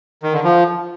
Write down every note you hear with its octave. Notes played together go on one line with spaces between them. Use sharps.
D#3
D3
F3